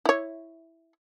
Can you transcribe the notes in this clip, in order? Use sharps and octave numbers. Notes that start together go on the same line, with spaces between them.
E4 C#5